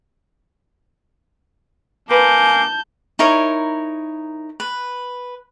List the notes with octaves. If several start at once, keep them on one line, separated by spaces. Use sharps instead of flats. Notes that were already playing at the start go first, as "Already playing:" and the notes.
A#3 B4 G#5 A5 G6
D#4 E4 A#4 C#5
B4